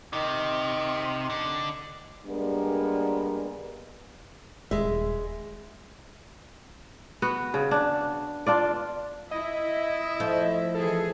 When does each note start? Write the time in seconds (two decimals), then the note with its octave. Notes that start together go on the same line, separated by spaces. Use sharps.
0.13 C3 D#3
1.30 D3
2.26 G3 G#3 A#3 B3 D4
4.71 D#1 G#3 E5
7.22 B3 F#4
7.54 C#3
7.71 D4
8.46 D4 F4 D5
9.31 E4 D#5
10.20 F3 A3
10.75 E3 G#4 A4